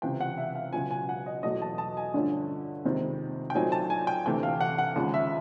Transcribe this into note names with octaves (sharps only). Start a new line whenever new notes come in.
C#2 C3 E3 G5
F#5
E5
F5
C#2 B2 F#3 G#5
G#5
F#5
D#5
E2 B2 F#3 A3 D#5
A5
A5
G#5
G2 D3 F3 A3 C#4
F2 C3 D#3 G#3 C4
G5
A#2 F#3 A3 C4 D#4 G#5
A5
G#5
G5
D2 C3 E3 A3 G5
F5
F#5
F#5
D#2 C#3 F3 G#3
E5